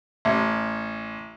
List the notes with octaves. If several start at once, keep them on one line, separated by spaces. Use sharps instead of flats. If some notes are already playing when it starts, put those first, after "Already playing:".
A1